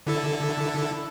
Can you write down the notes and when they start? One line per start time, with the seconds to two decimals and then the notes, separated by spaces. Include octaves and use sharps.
0.07 D3 E4 A4